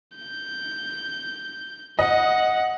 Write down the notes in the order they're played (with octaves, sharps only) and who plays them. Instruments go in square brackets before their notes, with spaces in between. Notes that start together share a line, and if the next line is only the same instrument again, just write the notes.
[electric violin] G6
[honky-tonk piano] D#5 [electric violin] F#5